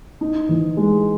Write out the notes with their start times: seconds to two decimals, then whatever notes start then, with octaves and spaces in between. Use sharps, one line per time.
0.21 D#4
0.49 E3
0.77 G#3